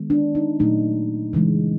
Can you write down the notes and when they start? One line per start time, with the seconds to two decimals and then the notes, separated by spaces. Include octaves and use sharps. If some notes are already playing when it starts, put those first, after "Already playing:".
Already playing: D#3 G#3 B3
0.10 D4
0.35 D#4
0.60 A#2 F#3 A3 D#4
1.33 C#3 E3 G#3